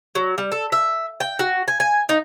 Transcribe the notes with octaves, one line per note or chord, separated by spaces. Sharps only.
F#3
G3
A4
E5
G5
F#4
G#5
G#5
D#4